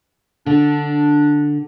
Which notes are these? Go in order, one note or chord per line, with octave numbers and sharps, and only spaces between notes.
D3 D4